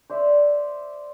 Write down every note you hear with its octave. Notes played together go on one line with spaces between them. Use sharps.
C5 D5 E5